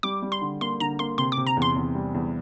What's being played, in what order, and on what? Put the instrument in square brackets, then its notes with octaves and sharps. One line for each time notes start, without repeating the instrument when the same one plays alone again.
[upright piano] G3 [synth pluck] D6
[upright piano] G3
[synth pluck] C6
[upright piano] D3
[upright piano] A#3 [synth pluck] C6
[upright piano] D3 [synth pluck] A#5
[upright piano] A#3 [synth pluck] C6
[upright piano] C3 [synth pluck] C6
[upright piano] C3 [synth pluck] D6
[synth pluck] A#5
[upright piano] E2
[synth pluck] C6
[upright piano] E2
G3
E2